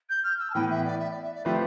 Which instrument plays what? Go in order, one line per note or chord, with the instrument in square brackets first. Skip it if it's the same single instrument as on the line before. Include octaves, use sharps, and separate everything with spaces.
[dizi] G6
F6
E6
A5
[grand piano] A2 E3 B3 [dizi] G5
[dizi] E5
D5
E5
D5
E5
D5
[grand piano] F3 A3 C4 G4 B4 [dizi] E5